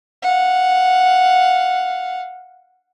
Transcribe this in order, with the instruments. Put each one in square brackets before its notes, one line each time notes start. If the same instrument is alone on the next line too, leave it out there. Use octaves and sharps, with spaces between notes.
[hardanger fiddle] F5 F#5